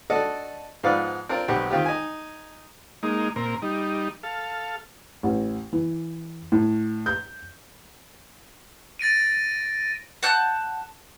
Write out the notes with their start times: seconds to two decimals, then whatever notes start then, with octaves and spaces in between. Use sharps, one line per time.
0.10 D4 F#4 A4 D5 D#5
0.84 G#2 F3 B3 B4 D5 F5
1.29 C4 D4 F4 A#4 D5
1.48 B1 B3 C4 G4 C#6
1.70 D#3 C4 F4 G4
1.85 D#4 G#5
3.03 G#3 A#3 D#4
3.36 A#2 C4 A#4
3.62 G3 D#4
4.23 A4 F5
5.23 A1
5.73 E3
6.52 A2
7.06 G6
8.99 A6 A#6 D7 D#7
10.23 F#5 A5 F#6 G6